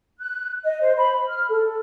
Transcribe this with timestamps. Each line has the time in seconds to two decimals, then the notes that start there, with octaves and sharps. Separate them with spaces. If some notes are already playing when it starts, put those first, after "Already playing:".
0.19 F#6
0.65 D#5
0.81 C5
0.98 B5
1.28 F6
1.50 A4